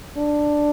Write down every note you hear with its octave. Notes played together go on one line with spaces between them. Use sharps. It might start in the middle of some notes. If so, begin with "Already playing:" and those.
D4